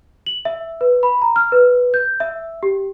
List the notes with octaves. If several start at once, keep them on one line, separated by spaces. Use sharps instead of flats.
F#7
E5
B4
B5
A#5
F6
B4
G6
E5
G4